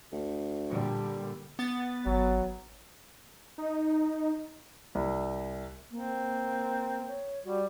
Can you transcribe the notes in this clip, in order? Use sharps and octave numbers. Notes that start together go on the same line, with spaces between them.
D2
A#2 D3 G3
B3 A6
G#1 F#3
D#4
C2
A#3 C4
C#5
G3 F#4